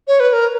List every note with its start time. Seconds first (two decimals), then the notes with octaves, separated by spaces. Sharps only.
0.08 C#5
0.20 B4
0.33 A#4